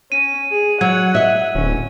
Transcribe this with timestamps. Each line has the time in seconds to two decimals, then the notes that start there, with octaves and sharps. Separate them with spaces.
0.12 C#4 D#7
0.52 G#4
0.81 F#3 F#5 G#6
1.15 D#5 E5
1.55 D1 C#4